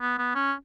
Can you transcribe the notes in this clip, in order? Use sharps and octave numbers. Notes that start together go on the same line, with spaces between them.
B3
B3
C#4